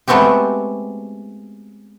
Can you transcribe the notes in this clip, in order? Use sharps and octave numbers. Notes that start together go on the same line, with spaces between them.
G#3 A3 B3 C4 F#4 G4